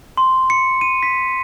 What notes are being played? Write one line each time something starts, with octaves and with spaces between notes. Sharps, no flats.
C6
C#7
D#7
B6